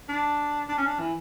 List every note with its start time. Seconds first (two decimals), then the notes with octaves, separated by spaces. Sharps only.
0.09 D4
0.69 D4
0.78 C#4
0.86 D4
0.99 E3